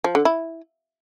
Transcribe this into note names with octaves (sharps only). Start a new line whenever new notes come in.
F3
D3
E4